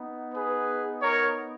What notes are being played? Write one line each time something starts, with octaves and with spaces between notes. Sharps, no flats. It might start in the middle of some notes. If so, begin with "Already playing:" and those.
Already playing: B3 D#4
G#4 B4
A#4 C#5